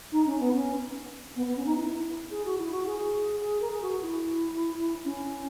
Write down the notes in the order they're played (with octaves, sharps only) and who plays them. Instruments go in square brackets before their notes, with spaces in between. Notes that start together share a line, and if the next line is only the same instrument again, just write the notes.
[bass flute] D#4
C#4
B3
C#4
B3
B3
C#4
D#4
E4
G#4
F#4
E4
F#4
G#4
G#4
G#4
A#4
G#4
F#4
E4
C#4